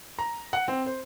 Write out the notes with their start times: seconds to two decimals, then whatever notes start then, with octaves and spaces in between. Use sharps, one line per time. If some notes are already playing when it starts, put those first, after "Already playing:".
0.19 A#5
0.53 F#5
0.68 C4
0.86 C5